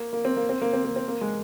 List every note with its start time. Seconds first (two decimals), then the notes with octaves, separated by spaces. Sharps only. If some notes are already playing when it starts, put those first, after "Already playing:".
Already playing: A#3
0.13 A#3
0.25 C4
0.37 A#3
0.49 C4
0.62 A#3
0.73 C4
0.85 A#3
0.96 C4
1.08 A#3
1.21 G#3